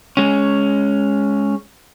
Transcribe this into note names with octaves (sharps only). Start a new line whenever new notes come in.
G#3 C#4